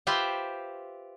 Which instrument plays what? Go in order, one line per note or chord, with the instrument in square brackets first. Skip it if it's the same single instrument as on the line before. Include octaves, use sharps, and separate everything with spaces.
[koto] F4 G4 B4 C5 E5